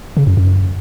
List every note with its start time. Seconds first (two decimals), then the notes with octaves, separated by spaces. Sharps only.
0.17 C#3
0.27 F#2
0.37 F#2